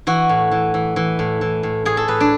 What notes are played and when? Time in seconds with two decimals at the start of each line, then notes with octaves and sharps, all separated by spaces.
0.07 E3 F#4
0.29 A2
0.51 E3
0.74 E3
0.96 E3
1.19 A2
1.41 E3
1.63 A2
1.85 A2 G#4
1.97 A4
2.08 A2 B4
2.20 D4